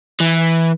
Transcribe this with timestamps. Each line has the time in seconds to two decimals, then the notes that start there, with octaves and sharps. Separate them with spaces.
0.20 E3